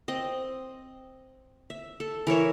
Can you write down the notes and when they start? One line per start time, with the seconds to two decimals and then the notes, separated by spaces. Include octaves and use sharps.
0.08 C4 D#5
1.70 E5
2.00 A4
2.27 E3 A#4 C#5 E5